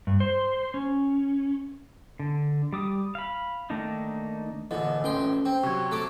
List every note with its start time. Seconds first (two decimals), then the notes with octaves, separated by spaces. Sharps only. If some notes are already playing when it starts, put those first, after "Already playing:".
0.07 G2
0.20 C5
0.74 C#4
2.20 D3
2.73 G3 D6 D#6
3.15 F5 B5
3.70 D#3 A3 A#3 D4 D#4
4.71 G#1 A#2 D3 E3 A4 D#5
5.04 A1 C#4 A4 G5 C6
5.45 C4 C5 G5
5.63 C3 F#3 C#6 G#6
5.91 A3 A4 D6